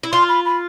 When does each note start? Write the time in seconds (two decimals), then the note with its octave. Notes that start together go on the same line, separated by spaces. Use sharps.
0.03 E4
0.12 F4 C6
0.29 B5
0.46 B5